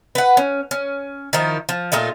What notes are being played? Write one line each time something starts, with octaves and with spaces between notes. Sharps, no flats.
B4 F#5
C#4
C#4
D#3 F3 D#4 E4
F3
A#2 A3 D#4 F4